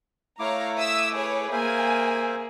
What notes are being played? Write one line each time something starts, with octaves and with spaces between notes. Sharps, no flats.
A3 E4 C#5 F5 A#5 D6
E5 D#6 E6
G#4 B4 C#5
A#3 G#4 C5 E5 F5 G#5